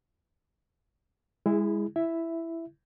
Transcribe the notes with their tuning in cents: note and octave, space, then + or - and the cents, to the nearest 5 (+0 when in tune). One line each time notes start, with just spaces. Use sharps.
G#3 -30 E4 +0 G#4 +0
E4 +10 E5 +0